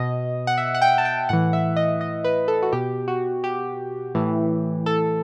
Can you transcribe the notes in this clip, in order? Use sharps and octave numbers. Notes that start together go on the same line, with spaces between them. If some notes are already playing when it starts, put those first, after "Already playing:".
Already playing: B2 D#5
F#5
E5
F#5
G5
A5
G5
A2 E3 F#5
E5
D#5
D#5
B4
A4
F#4
B2 G4
F#4
G4
A2 E3
A4